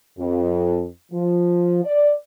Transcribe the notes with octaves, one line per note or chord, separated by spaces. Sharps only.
F2
F3
D5